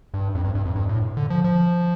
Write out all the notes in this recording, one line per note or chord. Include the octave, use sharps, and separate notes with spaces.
G2
F2
G2
G2
F2
G2
A2
D3
F3
F3